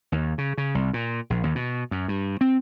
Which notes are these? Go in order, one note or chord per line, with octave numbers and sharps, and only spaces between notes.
D#2
C#3
C#3
C2
A#2
A#1
D#2
B2
F#2
G2
C4